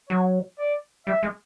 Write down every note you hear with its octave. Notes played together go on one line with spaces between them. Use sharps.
F#3 C#5
D5
G3 E5
G#3